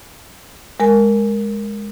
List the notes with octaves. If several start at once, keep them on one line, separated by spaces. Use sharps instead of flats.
G#3 A#4 G#5